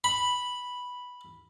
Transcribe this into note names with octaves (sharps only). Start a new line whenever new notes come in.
B5